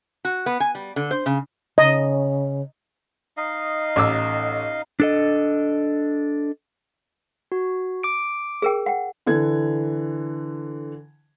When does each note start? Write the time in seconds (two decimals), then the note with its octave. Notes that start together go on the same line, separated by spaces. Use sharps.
0.25 F#4
0.46 B3
0.60 G#5
0.75 G3
0.96 D3
1.11 C5
1.26 C#3
1.78 C#3 D#5
3.37 D#4 D#5 F5
3.96 A1 D6 E6
5.00 D4 A4 D#5
7.52 F#4
8.03 D6 D7
8.62 G#4 A#4 G5
8.86 F#5 G5
9.26 D3 E3 G#6